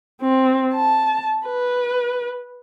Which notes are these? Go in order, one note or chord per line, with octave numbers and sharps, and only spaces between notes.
C4
A5
B4